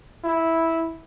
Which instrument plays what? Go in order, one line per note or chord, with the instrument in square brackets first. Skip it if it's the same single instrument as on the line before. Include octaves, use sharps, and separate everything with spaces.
[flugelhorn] E4